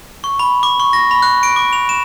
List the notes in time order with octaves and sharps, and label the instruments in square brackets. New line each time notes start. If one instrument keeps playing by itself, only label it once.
[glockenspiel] C#6
B5
D6
C#6
A#6
B5
F#6
D7
D6
F7
E7